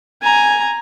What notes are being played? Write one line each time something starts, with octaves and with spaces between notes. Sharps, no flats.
G#5 A#5